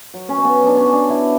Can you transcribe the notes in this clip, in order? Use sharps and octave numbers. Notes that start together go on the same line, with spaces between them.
F#3
C#4
B2
B3
F#3 D4
C#4
F#3
D4
B2 E4